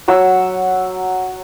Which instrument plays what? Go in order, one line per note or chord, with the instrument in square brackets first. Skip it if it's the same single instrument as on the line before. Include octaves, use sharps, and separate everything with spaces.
[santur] F#3 F#5 E6